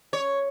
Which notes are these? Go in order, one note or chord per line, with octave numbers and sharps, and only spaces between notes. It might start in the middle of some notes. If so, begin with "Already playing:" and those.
C#5